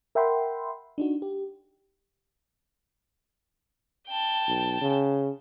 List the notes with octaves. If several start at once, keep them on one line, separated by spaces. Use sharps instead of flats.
A#4 E5 F#5 G5 B5 C6
D4 D#4 F#4
G4
G5 A5
B1
C#3